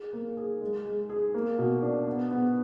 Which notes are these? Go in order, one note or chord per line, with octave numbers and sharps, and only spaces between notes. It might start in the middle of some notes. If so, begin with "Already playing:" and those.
Already playing: G#4
A#3
G#4
G#3
G#3
G#4
A#3
B2
D4
B3
B3